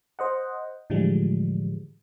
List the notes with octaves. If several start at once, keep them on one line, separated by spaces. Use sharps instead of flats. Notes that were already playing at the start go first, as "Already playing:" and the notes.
C5 D#5 F#5
A2 D3 E3 F3 G3 G#3